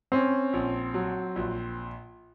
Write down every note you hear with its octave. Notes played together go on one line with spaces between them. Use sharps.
C4 C#4
A#1
F#3
A#1